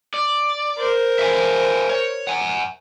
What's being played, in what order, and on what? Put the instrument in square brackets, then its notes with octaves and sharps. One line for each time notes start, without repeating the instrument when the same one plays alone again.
[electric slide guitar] D5
[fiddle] A#4 C5
[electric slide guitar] E5 F5 G#5
C#5
F#5 G#5